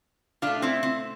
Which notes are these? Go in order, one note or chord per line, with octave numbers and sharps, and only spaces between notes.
B2 A3 D4 F4
C4 E4
C4